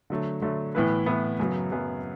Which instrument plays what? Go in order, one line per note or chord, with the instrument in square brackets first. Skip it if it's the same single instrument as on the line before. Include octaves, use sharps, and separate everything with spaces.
[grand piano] D3 F#3 A3
D3 F#3 A3
A2 E3 B3 E4 B4
A2 E3 B3 E4 B4
F#2 C#3 F#3 B3
F#2 C#3 F#3 B3